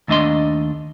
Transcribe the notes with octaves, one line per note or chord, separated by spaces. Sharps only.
D#2 A3 D4 D#5 C6